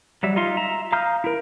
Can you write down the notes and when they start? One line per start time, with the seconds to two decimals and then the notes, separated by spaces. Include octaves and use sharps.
0.23 F#3 G3 E5
0.36 D#4 F4 C6
0.57 E5 A#5
0.92 F5 A#5 D#6 F6 G6
1.24 E4 A#4